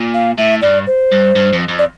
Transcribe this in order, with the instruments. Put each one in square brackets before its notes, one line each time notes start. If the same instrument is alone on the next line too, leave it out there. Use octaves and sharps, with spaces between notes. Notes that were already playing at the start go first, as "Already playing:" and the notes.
Already playing: [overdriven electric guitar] A#2
[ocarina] F5
[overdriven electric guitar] A2 [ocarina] E5
[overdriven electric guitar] G2 [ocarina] D5
[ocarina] C5
[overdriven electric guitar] G2
G2
F2
F2
[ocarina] D5